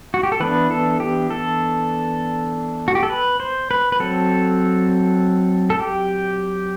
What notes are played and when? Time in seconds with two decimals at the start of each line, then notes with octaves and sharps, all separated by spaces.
0.14 F#4
0.23 G4
0.32 A4
0.40 E3 B3 D4 B4
0.71 A4
1.00 G4
1.30 A4
2.88 F#4
2.95 G4
3.03 A4
3.10 B4
3.40 C5
3.71 B4
3.92 B4
4.00 F#3 C4 A4
5.70 A4
5.80 G4